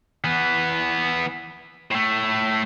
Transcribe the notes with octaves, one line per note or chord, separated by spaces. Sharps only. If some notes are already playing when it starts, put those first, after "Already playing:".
E3 B3
A2 A3